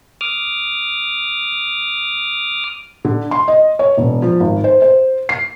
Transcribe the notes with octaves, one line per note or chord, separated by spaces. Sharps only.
D6 D#6 F6
D3
C6
D#5
C#5
E1
F3
G#1
C5
C5
C7